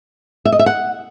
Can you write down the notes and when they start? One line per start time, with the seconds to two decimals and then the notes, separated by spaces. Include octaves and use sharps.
0.45 E5
0.52 D#5
0.59 E5
0.66 F#5